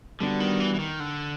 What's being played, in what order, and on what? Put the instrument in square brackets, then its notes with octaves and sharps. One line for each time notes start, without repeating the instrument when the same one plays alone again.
[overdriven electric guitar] D3 [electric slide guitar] G3 B3 D4 F#4
[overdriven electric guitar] D#3
E3
E3
D#3
D3